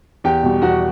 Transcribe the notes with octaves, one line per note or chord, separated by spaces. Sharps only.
E2 G4 G5
B2 G3
E2 F#4 F#5